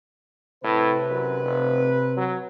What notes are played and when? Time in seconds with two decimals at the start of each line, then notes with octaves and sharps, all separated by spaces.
0.64 A2 C3 B4
1.10 F#2
1.43 F1
2.17 F#3